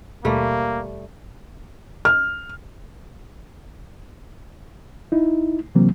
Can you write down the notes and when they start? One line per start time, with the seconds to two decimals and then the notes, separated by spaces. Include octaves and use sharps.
0.25 D#2 B2 G3 A3 A#3
2.05 F6
5.12 D#4 E4
5.75 C3 E3 F#3 A#3 C4